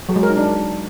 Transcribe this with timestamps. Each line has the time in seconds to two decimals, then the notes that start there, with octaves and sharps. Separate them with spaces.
0.09 F#3
0.16 G#3
0.23 A#4
0.30 D#4
0.37 D4